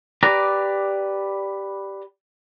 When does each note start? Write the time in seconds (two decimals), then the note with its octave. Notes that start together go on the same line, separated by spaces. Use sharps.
0.23 G4 B4 D5 A#5